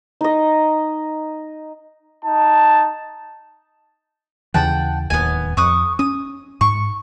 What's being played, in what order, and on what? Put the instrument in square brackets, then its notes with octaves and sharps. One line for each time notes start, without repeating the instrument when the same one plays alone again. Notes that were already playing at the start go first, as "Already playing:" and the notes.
[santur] D#4 D#5
[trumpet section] D#4 A5
[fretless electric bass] D#2 C#3 E3 [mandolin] F#5 G5 A5
[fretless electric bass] D1 D#2 [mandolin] B3 G#5
[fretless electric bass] F2 [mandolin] C#6 D#6 F#6
[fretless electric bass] C#4 [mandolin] D#6
[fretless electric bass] G#2 [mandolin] C#6